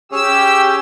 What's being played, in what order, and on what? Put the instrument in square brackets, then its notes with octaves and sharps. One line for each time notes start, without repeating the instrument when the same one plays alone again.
[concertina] C#4 G#4 C#5 [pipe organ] G4 E6